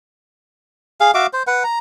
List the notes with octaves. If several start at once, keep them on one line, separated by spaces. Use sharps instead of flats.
G#4 F5
F#4 E5 F5 D6
C5
B4 F#5
A#5